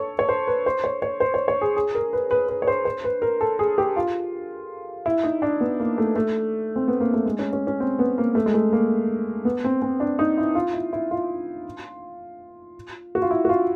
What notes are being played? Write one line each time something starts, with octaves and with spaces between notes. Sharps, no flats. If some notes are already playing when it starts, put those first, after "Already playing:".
Already playing: A4 C#5
C#5
C5
B4
C5
C#5
C#5
C5
C#5
C#5
G#4
G#4
A#4
B4
B4
B4
C#5
C5
C5
B4
A#4
A4
G#4
G4
F4
E4
D#4
D4
B3
A#3
A3
A3
C4
B3
A#3
A3
G#3
C#4
C#4
C#4
C4
B3
A#3
A3
G#3
A3
A#3
B3
C4
C4
D4
D#4
E4
F4
E4
E4
F4
F#4
F4
E4
F#4
F4